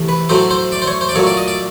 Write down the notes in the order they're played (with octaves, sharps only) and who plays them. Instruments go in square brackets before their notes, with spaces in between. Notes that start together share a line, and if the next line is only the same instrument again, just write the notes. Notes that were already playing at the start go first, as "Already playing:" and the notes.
Already playing: [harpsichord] C3 E3 A3
B4
A2 F#3 A3 C5
C5
D5
C5
C#5
C5
D5
A#2 F#3 A3 C#5
D5
D#5
D5